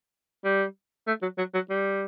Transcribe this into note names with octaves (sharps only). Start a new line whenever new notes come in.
G3
A3
F#3
F#3
F#3
G3